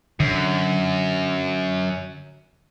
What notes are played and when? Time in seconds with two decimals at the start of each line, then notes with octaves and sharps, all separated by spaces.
0.20 F#2 D3